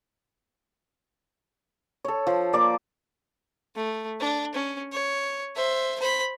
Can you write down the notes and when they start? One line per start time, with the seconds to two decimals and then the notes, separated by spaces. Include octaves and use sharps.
2.05 A4 C#5
2.27 F3
2.53 A#3 D5 D6
3.76 A3
4.20 D4
4.54 C#4
4.93 C#5
5.56 C5 E5
6.00 C5 B5